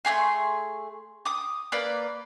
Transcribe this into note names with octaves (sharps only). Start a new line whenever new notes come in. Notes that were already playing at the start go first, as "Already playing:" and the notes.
A3 D4 G#4 C6
D6 D#6
A#3 B4 D5